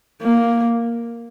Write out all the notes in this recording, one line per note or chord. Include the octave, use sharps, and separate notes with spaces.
A#3